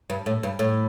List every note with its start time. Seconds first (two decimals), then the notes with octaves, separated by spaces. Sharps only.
0.10 G2
0.26 A2
0.43 G2
0.59 A2